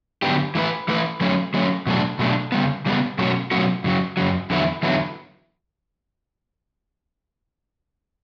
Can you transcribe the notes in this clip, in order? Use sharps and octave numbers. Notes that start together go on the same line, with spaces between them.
D3 F#3 B3 D4 G4
E3 A3 E4 B4
E3 A3 E4 B4
F#3 A3 C#4
F#3 A3 C#4
B2 F#3 A3 D4
B2 F#3 A3 D4
C#3 G3 B3
C#3 G3 B3
B2 F#3 A3 C#4 F#4
B2 F#3 A3 C#4 F#4
F#2 C#3 F#3
F#2 C#3 F#3
E2 D3 F#3 B3 E4
E2 D3 F#3 B3 E4